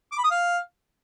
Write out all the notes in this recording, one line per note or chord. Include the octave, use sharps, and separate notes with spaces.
D6
B5
D#6
F5